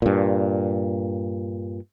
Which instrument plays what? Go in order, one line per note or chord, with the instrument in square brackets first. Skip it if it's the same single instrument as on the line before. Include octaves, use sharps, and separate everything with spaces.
[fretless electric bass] G2 A#2